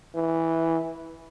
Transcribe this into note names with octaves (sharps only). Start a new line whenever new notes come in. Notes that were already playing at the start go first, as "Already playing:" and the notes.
E3